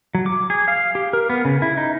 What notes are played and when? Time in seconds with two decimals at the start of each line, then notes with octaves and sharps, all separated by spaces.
0.15 F#3
0.26 D6
0.50 G#4
0.68 F5
0.95 G4
1.13 A#4
1.30 B3
1.45 C#3
1.62 E4
1.77 D#4